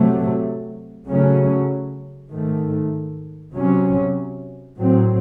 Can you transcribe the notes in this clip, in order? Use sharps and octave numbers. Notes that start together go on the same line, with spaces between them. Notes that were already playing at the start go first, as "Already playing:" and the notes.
Already playing: C3 F#3 A3
C#3 F#3 A3 C#4
G#2 D#3 A3
C3 F#3 C#4
A2 F#3 C4